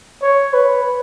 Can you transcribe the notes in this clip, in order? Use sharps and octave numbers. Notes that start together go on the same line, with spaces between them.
C#5
B4